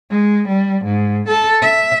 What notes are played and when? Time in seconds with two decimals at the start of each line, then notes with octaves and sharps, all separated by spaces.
0.11 G#3
0.48 G3
0.85 G#2
1.28 A4
1.62 E5